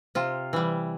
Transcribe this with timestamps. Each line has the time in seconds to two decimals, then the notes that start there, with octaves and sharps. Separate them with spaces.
0.15 C3 F4
0.53 E3 G3